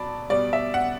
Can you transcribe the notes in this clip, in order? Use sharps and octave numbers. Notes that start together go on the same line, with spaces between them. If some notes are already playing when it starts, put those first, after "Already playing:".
Already playing: B2 F#3 D5 A5 B5
B2 G3 D5
E5
F#5